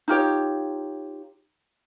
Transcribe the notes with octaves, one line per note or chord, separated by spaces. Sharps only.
D#4 F4 G4 C#5